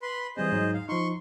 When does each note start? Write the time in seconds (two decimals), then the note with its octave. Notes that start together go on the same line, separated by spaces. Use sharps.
0.02 B4 B5 C6
0.37 E3 G3 C4 G#4 C5 D#5
0.52 G#2 F#3 D#4
0.74 F5
0.89 F3 D#4 C6 C#6